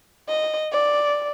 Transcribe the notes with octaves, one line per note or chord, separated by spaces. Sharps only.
D#5
D5